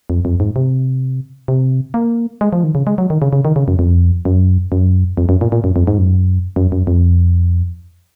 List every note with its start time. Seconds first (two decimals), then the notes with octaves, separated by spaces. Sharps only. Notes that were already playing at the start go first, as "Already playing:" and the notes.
0.10 F2
0.25 F2
0.40 G#2
0.56 C3
1.48 C3
1.94 A#3
2.41 G#3
2.53 F3
2.64 D#3
2.75 C#3
2.87 G#3
2.98 F#3
3.10 D#3
3.22 C#3
3.33 C#3
3.45 D#3
3.56 C#3
3.68 F#2
3.79 F2
4.25 F#2
4.72 F#2
5.17 F2
5.29 F#2
5.41 A#2
5.52 A#2
5.64 F#2
5.76 F2
5.87 G#2
5.98 F#2
6.56 F#2
6.72 F#2
6.87 F2